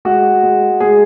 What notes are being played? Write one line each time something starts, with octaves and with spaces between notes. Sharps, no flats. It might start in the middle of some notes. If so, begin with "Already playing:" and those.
G#3 F#4
G#3
G#3 G#4